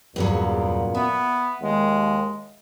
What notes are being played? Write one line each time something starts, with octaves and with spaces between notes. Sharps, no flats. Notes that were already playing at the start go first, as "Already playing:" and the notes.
E2 G2 A#2 C#3 F#3
B3 E5
D#2 G#3